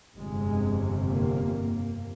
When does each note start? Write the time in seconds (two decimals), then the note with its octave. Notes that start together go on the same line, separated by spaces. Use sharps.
0.15 G1 F2 C3 G#3
1.09 A#3
1.56 A#3